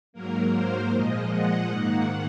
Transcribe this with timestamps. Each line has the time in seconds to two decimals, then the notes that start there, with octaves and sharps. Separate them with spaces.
0.13 G#2 F#3 A#3 A#4
0.52 C5
0.90 A#2 F3 G#3 D#5
1.29 F#5
1.69 G#2 D#3 A#3